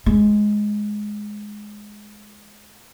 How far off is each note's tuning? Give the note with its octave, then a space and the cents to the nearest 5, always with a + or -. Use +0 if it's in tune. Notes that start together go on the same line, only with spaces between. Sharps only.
G#3 +5